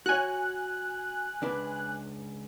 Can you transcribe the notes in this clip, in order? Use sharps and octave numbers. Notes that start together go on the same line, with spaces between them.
F#4 C#5 G#5 F#6
C#2 D4 B4